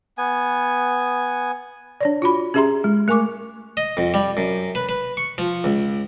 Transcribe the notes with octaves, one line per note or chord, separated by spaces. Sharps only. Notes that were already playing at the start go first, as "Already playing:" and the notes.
B3 G#5
D4 C#5 D5
F4 F#4 B5
C#4 G4 G#4 E5 A#5 C6
G#3
A3 A#4 G#5 C#6 D6
D#5
F2
G3
F#2
B4
B4
C#6
F3
C#2